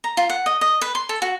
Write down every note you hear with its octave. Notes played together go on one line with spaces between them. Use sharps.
A#5
F4
F#5
D#5
D#5
B4
C6
A4
F#4